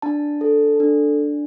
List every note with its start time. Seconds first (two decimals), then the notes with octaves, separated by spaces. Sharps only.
0.02 D4 A5
0.41 A4
0.80 D4